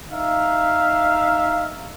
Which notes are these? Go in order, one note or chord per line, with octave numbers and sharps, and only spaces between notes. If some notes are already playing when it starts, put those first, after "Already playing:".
D#4 E5 F5